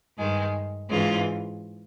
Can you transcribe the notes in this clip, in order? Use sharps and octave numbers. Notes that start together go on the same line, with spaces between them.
G2 D#3 G#3
G#2 E3 G#3 C#4 F4